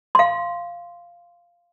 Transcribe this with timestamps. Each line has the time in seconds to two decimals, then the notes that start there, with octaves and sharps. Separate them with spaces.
0.15 F5 C6